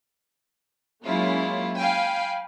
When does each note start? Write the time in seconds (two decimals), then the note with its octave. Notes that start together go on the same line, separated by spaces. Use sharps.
1.04 F#3 G#3 A#3 C#4 E4 F4
1.78 F5 G5 G#5 B5